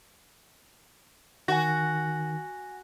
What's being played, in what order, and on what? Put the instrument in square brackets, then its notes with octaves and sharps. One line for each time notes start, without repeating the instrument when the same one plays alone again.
[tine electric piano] D#3 [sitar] F#4 [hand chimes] G#5 A#6